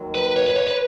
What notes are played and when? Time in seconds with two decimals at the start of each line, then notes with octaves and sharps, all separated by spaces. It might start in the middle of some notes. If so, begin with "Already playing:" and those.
Already playing: D#2 D#3 F#3
0.15 B4
0.36 C#5
0.46 B4
0.56 C#5
0.67 B4